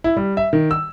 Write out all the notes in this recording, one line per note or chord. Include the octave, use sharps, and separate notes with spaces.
E4
G3
E5
D#3
E6